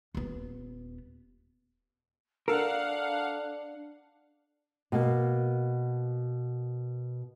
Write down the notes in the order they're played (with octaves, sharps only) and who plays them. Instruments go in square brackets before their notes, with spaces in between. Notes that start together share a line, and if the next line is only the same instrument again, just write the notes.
[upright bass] D#1 B3
[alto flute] D4 [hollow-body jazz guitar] A4 A#4 [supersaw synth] F5 F#5
[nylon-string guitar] B2 A#3